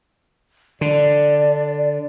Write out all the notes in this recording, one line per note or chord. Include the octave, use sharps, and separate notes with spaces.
D3 D5